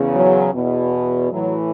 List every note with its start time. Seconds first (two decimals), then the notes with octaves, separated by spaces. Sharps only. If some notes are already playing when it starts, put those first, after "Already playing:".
Already playing: E2 C#3
0.14 F#3
0.53 E2 B2
1.32 A2 E3 F#3